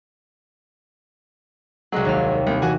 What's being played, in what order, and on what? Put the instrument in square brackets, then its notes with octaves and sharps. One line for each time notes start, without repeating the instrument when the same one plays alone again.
[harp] C2 F#6 [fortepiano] F#3 G#3
[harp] D#2 A#3 F6
[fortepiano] C2
[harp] E3 [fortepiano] F#4 F#5 G#5